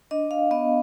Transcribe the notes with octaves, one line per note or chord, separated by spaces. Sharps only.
D4 D#5
F5
B3 D#5